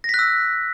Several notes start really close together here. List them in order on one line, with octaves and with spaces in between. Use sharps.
A#6 B6 F#6 E6